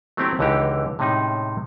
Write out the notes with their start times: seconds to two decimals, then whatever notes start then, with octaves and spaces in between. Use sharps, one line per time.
0.17 F#3 A3 A#3 C4 E4 G4
0.39 C#2 D3 E3 D#4 G4 A#5
0.99 A2 C3 G#3 C#4 D#4